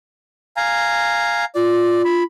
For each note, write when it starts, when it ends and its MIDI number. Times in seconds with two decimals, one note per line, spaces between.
0.57 1.45 77
0.57 1.45 80
0.57 1.45 82
1.55 2.24 65
1.55 2.02 74
2.05 2.23 83